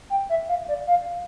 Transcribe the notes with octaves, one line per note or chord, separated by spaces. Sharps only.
G5
E5
F5
D5
F5